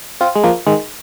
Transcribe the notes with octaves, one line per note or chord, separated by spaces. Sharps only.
C4 F4
G#3
F3 A#3
D#3 G#3